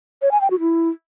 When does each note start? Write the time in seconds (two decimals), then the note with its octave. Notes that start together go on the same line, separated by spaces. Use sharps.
0.22 C#5
0.31 G#5
0.41 G5
0.50 F#4
0.60 E4